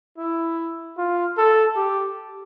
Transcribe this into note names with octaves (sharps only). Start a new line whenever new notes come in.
E4
F4
A4
G4